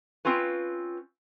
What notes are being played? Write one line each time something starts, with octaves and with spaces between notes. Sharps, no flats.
C4 C#4 F4 B4